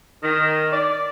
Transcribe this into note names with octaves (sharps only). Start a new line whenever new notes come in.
D#3
D5